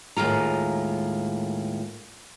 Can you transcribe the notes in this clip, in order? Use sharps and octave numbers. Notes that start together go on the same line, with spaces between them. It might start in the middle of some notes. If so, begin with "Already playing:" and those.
D#2 A2 G#3 F4 A#5